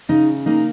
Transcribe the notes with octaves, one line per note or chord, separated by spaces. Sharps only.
C#3 D#4
A#3 D#4